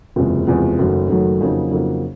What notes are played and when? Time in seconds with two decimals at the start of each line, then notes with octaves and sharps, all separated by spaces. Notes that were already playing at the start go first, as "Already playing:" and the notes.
0.16 F#1 E2 C3 F3 G#3
0.47 F#1 E2 C3 F3 G#3
0.79 F#1 F#2 D#3 F#3 A3
1.09 F#1 F#2 D#3 F#3 A3
1.41 F2 C#3 F#3 A#3 D#4
1.71 F2 C#3 F#3 A#3 D#4